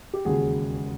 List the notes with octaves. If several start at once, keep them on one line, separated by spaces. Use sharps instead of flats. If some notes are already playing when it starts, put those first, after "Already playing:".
G4
E1 D#2 C#3 F#4 G#4